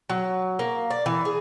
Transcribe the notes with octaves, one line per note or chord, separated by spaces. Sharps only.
F#3
A#3
D5
E3
G#4